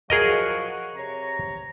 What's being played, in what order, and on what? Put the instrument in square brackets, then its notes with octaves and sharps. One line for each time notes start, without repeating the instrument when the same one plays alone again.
[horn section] F3 F#3 F#4 [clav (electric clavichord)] G#4 A#4 D#5
[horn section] C3 C#5 A#5